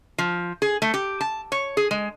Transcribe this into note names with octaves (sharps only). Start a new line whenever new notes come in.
F3
G#4
A3
G4
A5
C#5
G#4
G#3